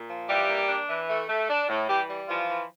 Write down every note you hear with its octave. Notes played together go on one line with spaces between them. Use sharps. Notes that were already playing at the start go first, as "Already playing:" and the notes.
Already playing: A#2
F3
E3 G3 G4
A#3
D4
E3
A3
A3
D4
A2
E3 G3 G4
G3
E3 F3 F4
E3